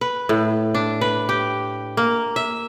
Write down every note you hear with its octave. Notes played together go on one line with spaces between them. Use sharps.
B4
A2
D4
B4
G4
A#3
E5